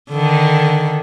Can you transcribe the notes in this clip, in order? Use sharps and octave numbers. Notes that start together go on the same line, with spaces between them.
D3 D#3